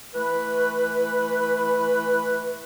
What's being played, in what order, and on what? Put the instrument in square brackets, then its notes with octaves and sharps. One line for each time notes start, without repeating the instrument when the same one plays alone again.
[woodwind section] E3 A3 B4